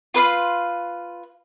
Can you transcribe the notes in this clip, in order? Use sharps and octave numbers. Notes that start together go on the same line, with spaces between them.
F4 B4 F5 C6